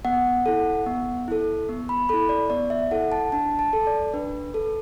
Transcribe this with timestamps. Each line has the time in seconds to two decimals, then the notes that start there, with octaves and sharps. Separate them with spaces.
0.05 B3 F#5
0.46 E4 A4
0.87 B3
1.28 E4 A4
1.69 B3
1.89 B5
2.09 E4 A4 B5
2.29 D5
2.50 B3 D5
2.70 E5
2.91 E4 A4 F#5
3.12 A5
3.32 D4 A5
3.59 A5
3.73 A4
3.87 D5
4.13 D4 B4
4.54 A4